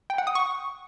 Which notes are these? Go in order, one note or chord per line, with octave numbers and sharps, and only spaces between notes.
G5
F#5
D#6
C#6